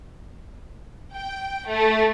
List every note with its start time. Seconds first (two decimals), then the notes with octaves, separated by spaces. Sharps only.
1.15 G5
1.67 A3